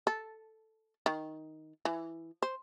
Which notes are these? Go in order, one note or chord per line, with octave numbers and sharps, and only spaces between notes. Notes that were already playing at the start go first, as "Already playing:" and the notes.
A4
D#3
E3
C5